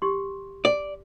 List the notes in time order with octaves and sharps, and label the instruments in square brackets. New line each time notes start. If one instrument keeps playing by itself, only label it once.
[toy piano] G4 C6
[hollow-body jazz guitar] D5